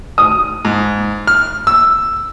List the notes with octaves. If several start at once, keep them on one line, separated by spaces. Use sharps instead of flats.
D#6
G#2
F6
E6